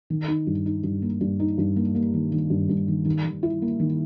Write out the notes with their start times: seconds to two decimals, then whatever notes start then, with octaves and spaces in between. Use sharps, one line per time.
0.10 D#3
0.28 D#4
0.47 G2
0.66 D#4
0.83 G2
1.02 A#3
1.21 G2
1.40 D#4
1.58 G2
1.76 A#3
1.95 A#3
2.14 D#3
2.32 D#3
2.50 G2
2.69 G2
2.88 D#3
3.05 D#3
3.25 D#3
3.43 E4
3.62 A#3
3.80 D#3